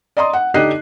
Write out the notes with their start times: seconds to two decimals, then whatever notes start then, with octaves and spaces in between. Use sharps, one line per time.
0.17 D5 D#5 A#5 C6 D#6
0.33 F#5
0.54 D3 D#4 G4 D#5 F#6 C7